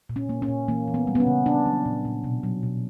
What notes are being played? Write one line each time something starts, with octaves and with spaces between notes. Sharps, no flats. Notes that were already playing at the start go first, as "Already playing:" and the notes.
A#2
C#4
A#3
C#4
A#2
E3 A#3
E3
B3
G3
B3
C#4
C#3
A#2 D4
F#3
A#2
A#2
B2
F#3
B2